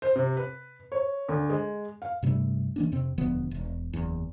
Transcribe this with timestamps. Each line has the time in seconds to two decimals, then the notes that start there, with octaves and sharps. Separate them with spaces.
0.02 C5
0.16 C3
0.37 B4
0.92 C#5
1.29 D2
1.50 G#3
2.02 F5
2.23 G2 C3 G3 A3
2.76 E3 A#3 D4
2.92 F2 C3 C4
3.18 E1 D2 F3 B3
3.51 E1
3.94 F#1 E2